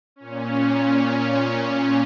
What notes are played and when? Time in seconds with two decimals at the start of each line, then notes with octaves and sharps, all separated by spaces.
0.16 A#2 C#4